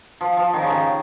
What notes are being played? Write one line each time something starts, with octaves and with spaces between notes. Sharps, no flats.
F3
F3
D#3
C#3
D#3